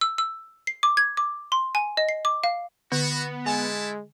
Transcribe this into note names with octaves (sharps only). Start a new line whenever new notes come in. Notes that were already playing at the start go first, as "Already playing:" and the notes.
E6
E6
C7
D6
G#6
D6
C6
G#5
D#5
C7
D6
F5
D3 B3 F#4
G#3 A3 E4 G#5 A5